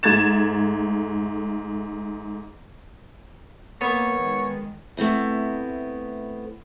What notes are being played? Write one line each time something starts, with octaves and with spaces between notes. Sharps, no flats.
G#2 A3 G#6 A6 E7
A#3 B3 A#4 C#5 F#5
D#3 G#3
A3 B3 C4 E4